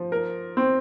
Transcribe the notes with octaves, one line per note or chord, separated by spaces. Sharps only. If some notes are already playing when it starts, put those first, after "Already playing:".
Already playing: F3
A#4
C4